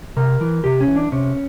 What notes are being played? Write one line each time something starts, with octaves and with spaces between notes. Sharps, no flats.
C3 A#4
E3
C3 G4
C#4
E3
D4
C3 C#4